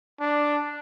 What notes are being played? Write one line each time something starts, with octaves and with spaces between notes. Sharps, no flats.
D4